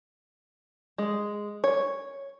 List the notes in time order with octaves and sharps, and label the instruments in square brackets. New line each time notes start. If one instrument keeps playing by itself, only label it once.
[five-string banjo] G#3
C#5